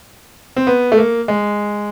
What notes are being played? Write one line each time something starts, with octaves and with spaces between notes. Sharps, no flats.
C4
B3
A3
A#3
G#3